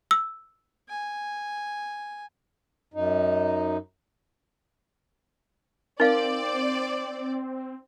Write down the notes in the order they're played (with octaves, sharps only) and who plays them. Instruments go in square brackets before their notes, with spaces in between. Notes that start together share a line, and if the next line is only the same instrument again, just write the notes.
[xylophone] E6
[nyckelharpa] G#5
[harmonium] F#2 D#4
[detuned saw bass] C4 [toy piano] D#4 F5 [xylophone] A#4 [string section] C5 D5